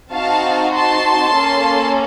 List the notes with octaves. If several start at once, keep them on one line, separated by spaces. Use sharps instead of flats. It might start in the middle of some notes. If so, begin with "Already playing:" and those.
C4 D#4 F#4 F5 A5
A5 C6
A#3 C#4 A4